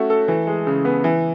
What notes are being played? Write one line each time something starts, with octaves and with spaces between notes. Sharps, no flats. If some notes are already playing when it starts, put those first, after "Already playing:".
Already playing: A3 C#4 F#4
A4
E3
G#3
C#3
B3
E3